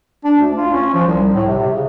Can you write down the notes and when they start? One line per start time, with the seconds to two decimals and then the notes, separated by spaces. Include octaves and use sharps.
0.25 D4
0.39 D2
0.56 F4
0.74 C#4
0.94 F3
1.06 C2
1.34 A2
1.48 C3
1.59 C3
1.72 C#3